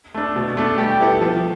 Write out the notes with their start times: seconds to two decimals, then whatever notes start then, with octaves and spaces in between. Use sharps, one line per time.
0.14 A3 D4
0.36 B2
0.57 A3 D4 A4
0.78 G3 G4
1.00 B3 E4 A4
1.21 F3